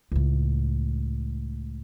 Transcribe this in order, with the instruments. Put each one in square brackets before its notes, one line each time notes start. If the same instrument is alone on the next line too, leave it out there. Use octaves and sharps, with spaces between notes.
[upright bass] C#2 A2